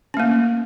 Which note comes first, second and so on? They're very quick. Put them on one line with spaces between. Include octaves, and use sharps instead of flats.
C#4 A3 A#3